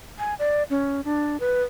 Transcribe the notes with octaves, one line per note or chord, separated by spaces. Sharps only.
G#5
D5
C#4
D4
B4